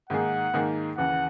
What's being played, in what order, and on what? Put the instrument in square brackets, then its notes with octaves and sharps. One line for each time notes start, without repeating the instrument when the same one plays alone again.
[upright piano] G#2 D#3 A#3 D#4 G#4 [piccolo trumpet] F#5
[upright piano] G#2 D#3 A#3 D#4 G#4
[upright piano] D#2 C#3 E3 [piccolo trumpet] F#5